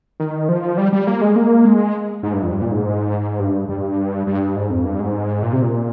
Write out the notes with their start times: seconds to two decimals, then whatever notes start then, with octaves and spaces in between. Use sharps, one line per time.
0.20 D#3
0.49 F3
0.78 G3
0.93 G3
1.07 A#3
1.21 G#3
1.36 A#3
1.65 G#3
2.23 G#2
2.33 G2
2.42 F2
2.52 G2
2.61 A#2
2.72 G#2
3.39 G2
3.69 G2
4.27 G2
4.56 G#2
4.70 F2
4.85 G2
5.00 G#2
5.43 A#2
5.53 C3
5.62 A#2